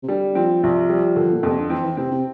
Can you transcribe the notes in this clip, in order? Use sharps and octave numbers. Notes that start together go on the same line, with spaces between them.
C3
D3 G3
F3 C4
C2 F3
G3
D3
A#2
F2 C3
D3
E3 C4
E3
C3 C4
C3